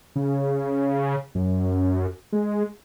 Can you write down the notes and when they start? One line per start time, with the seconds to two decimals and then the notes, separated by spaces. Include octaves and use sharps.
0.16 C#3
1.35 F#2
2.33 G#3